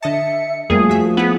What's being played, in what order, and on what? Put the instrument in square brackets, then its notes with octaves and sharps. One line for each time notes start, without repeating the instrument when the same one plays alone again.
[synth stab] D3 D#5 A5 [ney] E5 [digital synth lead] C#7
[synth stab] F2 G3 A#3 [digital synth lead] F3 [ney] A3 [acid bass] G#4
[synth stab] F#4 E5
[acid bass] B3 [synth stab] E4 G#4